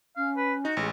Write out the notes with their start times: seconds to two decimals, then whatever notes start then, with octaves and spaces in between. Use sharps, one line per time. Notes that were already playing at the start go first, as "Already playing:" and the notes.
0.16 C#4 F5
0.37 B4
0.65 D#4 F#4
0.77 A1 G#3